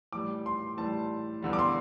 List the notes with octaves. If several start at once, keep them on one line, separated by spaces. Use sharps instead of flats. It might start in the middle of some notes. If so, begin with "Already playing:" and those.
A2 E3 G3 D6
C6
A2 E3 G3 A5
E2 D3 G3
D6
C6